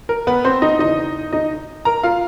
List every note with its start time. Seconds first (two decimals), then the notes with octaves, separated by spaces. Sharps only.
0.09 A#4
0.27 B3 B4
0.45 C4 C5
0.62 D#4 D#5
0.79 E2 C#3 E3 D#4 D#5
1.33 D#4 D#5
1.85 A#4 A#5
2.03 F4 F5